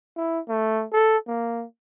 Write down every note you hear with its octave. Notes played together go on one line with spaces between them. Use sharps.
E4
A3
A4
A#3